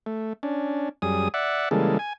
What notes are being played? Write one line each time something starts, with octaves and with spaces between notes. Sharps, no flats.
A3
C#4 D4
F#2 G3 G#4 D#6
D5 E5 F#5
C#3 E3 G3 G#3 A#3 A4
G#5